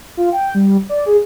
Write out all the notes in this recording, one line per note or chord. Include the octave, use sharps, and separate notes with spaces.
F4
G5
G3
D5
G#4